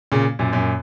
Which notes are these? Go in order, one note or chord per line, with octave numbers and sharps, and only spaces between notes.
A#2 C#3
F#2 A#2
F#2 A#2